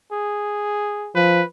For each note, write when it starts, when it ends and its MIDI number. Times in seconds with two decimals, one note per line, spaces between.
0.12 1.15 68
1.15 1.42 53
1.15 1.45 71